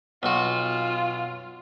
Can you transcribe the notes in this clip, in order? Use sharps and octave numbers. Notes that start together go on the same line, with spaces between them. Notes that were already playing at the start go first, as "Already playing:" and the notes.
B1 F4 F#4